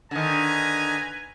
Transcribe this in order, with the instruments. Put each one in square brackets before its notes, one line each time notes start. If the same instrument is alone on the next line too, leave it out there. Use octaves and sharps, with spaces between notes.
[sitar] D3 D#3 [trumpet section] B4 G#5 A#5